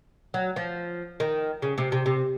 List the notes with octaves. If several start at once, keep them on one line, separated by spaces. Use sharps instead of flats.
F#3
F3
D#3
C#3
C3
C3
C3